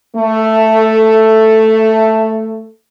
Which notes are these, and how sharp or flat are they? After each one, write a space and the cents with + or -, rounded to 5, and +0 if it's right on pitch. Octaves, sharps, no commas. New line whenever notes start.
A3 +5